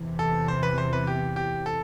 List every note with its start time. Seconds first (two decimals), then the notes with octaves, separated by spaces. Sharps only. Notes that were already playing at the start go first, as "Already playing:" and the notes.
Already playing: E2 C3 E3
0.19 A4
0.48 C5
0.63 B4
0.78 C5
0.93 B4
1.07 G4
1.36 G4
1.66 A4